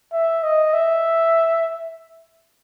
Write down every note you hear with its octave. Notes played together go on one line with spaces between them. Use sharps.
E5
D#5
E5